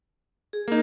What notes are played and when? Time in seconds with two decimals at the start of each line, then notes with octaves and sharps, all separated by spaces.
0.53 G#4
0.68 A#3 D#4